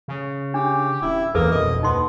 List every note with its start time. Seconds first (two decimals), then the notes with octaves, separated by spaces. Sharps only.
0.08 C#3
0.54 D4 G4
1.02 D#1 C#4 E4
1.35 B1 E2 E3 A#3 A4 B4 D#6
1.52 F2 B2 D#5
1.83 D#2 B3 D#4 C6